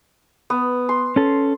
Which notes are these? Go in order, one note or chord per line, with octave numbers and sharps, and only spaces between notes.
B3
C6
C#4 A4